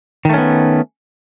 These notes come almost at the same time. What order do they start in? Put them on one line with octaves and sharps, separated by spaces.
D#3 A3 C#4 B3